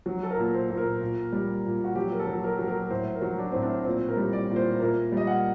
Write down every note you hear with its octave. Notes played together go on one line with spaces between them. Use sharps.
F#3
A4
A#4
A#2
C5
A#2
A#4
A#2
G3
A#2
F#4
F#3 G4
A#4
A4
F#3
A#4
F#3 A4
A#4
A2 C5
A#4
F#3
D4
A2 C4
D4
A#2 C4
A#4
G3
D5
A#2
C5
A#2 A#4
G3 D#5
F#5